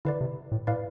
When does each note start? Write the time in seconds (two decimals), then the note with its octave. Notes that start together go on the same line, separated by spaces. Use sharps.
0.05 D3 E4 B4 D5
0.21 C3
0.52 A2
0.67 A2 E4 B4 D5 F5